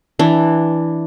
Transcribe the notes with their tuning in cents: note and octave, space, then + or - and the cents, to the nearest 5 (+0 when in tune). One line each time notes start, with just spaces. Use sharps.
E3 -5 D4 +0